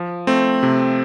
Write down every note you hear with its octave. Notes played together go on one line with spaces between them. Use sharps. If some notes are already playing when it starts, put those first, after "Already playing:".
Already playing: F3
A3 C4
C3